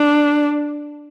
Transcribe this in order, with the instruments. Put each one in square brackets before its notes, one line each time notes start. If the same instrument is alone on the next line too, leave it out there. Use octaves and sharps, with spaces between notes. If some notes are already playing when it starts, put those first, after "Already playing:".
Already playing: [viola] D4